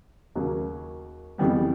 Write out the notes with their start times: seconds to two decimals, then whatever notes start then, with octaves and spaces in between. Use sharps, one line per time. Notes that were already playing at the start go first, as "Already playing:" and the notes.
0.35 D#2 C#3 F#3 A#3
1.38 F2 C#3 E3 G3 B3